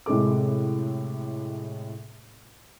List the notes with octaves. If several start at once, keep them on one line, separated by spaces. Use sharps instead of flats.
A2 C3 G#3 A4 D6